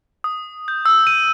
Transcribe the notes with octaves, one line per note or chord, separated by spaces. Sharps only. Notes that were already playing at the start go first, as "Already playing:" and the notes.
D#6
G6
E6
D#7